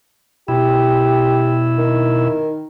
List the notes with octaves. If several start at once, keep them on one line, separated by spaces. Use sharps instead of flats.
B2 E4 G4
D#3